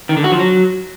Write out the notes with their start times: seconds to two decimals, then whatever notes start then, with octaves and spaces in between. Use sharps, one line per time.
0.09 D#3
0.17 D3
0.24 F#4
0.32 F3
0.39 F#3